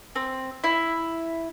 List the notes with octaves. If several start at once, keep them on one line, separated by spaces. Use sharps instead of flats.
C4
E4